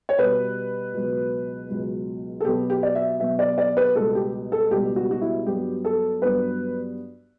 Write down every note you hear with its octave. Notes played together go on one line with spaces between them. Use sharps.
C#5
B2 G3 B3 B4
C#2 B2 F#3
C#2 B2 F#3
A4
B2 F#3 B3 G4
G4
D5
E5
B2 F#3 B3 E5
D5
D5
B4
C#2 B2 G3 B3 A4
G4
A4
C#2 B2 G3 B3 G4
F#4
F#4
E4
G2 F#3 B3 G4
A4
G2 F#3 B3 B4